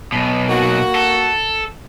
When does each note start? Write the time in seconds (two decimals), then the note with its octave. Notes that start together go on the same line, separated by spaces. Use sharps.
0.12 B1 B2
0.49 A#3 F#4
0.95 A4